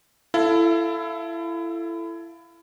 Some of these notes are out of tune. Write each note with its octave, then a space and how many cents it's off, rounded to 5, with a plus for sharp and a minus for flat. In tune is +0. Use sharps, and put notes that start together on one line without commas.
E4 +25 A4 +0 F5 +5